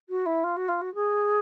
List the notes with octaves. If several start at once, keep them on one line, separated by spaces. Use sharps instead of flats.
F#4
E4
F4
F#4
F4
F#4
G#4